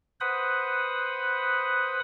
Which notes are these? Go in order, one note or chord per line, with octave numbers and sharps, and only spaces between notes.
B4 C5 F#5 B5 D#6